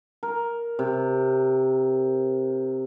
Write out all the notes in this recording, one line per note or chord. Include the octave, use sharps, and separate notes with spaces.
A#4
C3